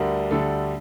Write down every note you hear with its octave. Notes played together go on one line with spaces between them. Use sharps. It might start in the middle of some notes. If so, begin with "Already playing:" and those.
Already playing: D2 D3 G3 A#4
D2 D3 G3 A4